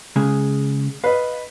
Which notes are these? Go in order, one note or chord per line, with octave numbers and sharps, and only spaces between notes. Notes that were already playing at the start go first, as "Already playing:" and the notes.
C#3 G#3 G#4
B4 D#5 F5